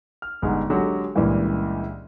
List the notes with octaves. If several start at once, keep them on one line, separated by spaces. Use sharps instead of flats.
F6
G1 G#3 D#4 F#5
D3 F#3 G#3 F#4 G4
C#2 G2 A#2 C#3 E3 G3